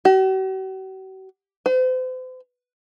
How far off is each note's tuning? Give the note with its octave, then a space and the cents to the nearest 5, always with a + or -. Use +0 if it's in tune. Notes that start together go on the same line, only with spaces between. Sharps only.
F#4 +45
C5 -40